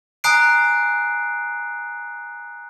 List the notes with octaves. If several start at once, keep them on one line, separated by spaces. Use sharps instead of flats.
G#5 A#5 D#6 F#6 C7 D7